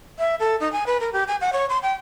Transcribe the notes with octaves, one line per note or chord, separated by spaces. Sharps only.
E5
A4
D#4
G#5
B4
A#4
G4
G#5
F#5
C#5
C6
G5